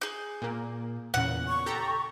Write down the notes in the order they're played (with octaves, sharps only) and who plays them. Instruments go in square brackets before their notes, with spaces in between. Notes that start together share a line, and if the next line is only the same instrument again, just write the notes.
[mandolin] G#4 G6
[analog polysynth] A#2 A#3
[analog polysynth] E2 A#2 C#3 [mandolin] F#5
[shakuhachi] C#6
[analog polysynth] G4 A4 A#5